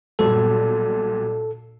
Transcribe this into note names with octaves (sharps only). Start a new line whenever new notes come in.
B1 A#2 G3 A4